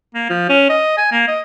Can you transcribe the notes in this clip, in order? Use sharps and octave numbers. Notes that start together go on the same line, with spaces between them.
A#3
F3
C#4
D#5
G#5
A#3
D#5